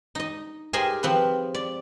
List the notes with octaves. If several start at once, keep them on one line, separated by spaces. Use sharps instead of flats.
D#4 D#5
G4 G#4 A#4 C5 D#5 G#5
F3 C4 B4
D5